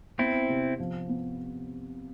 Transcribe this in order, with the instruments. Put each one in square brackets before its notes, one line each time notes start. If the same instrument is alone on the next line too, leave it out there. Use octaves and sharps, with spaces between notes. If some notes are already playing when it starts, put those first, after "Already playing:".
[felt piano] B3 [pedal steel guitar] C4 E4
[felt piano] C3
F3
B3